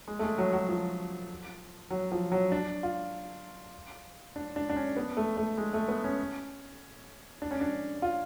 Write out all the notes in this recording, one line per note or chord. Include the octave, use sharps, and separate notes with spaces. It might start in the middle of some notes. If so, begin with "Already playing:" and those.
G#3
A3
G#3
F#3
F#3
F3
F#3
F3
F#3
D4
F4
D4
D4
D4
C#4
B3
A3
A3
G#3
A3
B3
C#4
D4
C#4
D4
F4